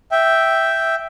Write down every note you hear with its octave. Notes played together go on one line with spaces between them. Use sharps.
E5 G5